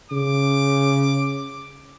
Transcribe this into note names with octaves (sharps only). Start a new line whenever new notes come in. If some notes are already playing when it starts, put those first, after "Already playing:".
C#3 D6